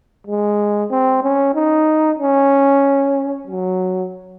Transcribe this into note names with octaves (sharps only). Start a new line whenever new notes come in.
G#3
C4
C#4
D#4
C#4
F#3